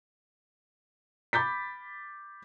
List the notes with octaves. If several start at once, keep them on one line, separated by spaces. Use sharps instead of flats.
B5 D6 G6 A6 B6